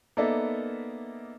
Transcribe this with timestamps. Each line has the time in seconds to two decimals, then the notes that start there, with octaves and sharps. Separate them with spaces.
0.17 A#3 B3 D#4 A4 D5 E5